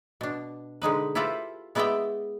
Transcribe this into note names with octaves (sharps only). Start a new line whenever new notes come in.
B2 D4
D3 G#3 D#4 B4
E4 F4 G4 A4 B4 C5
G#3 B3 E4 D5 E5 G5